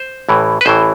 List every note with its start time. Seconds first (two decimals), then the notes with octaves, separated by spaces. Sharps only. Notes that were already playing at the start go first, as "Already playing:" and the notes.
Already playing: C5
0.29 A1 A2 E3
0.61 B4
0.65 A1 A2 E3 C5